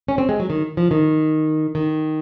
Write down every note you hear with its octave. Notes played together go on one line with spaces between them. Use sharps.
C#4
C4
G#3
F#3
D#3
F3
D#3
D#3